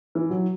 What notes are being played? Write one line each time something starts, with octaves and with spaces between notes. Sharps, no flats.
E3
F#3